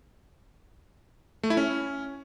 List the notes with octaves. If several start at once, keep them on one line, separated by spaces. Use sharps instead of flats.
A3
E4
C#4